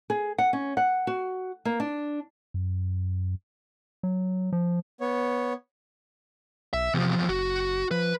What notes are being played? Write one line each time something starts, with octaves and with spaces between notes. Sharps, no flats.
G#4
F#5
C#4
F#5
F#4
A#3
D4
F#2
F#3
F3
B3 C#5
B1 E5
E2 C3 F3
F#1 F#4
F3 B4